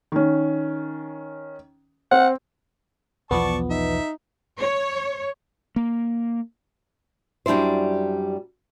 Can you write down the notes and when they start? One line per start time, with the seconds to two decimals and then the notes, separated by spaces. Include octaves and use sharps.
0.12 D#3 C#4
2.12 C4 F#5
3.31 B1 E2 F3 B3 D5 A5 C#6
3.70 D#4 E5
4.59 C#5
5.76 A#3
7.46 F#2 G3 D4 E4 C5